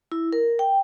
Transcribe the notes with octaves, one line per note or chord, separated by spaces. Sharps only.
E4
A#4
G5